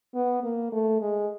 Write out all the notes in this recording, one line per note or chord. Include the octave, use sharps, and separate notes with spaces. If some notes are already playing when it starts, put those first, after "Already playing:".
B3
A#3
A3
G#3